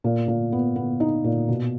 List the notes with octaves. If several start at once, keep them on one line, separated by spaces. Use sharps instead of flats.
A#2
A#2
B3
B3
D#4
A#2
B2